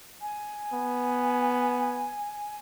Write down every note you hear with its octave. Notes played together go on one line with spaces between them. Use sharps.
G#5
B3